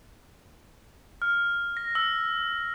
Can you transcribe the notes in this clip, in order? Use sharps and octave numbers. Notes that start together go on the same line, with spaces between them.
F6
A#6
E6